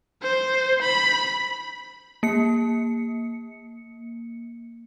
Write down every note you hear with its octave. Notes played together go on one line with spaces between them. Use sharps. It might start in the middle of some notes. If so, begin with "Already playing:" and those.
C5
B5
A#3 C#7